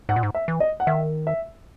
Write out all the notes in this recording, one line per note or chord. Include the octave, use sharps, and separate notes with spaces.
G#2 F#5
A#2
G#2
E5
E3
D#5
F#5
D#3 E5
E5